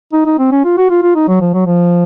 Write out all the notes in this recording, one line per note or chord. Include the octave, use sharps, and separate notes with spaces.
D#4
D#4
C4
C#4
F4
F#4
F4
F4
D#4
F#3
F3
F#3
F3